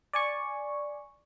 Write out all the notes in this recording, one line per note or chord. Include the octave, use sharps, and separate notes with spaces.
D5 G#5 C#6